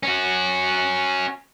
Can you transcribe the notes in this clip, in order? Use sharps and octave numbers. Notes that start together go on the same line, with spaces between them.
C#4 F#4